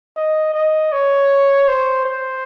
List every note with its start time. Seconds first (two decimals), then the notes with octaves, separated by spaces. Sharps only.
0.17 D#5
0.54 D#5
0.92 C#5
1.68 C5
2.06 C5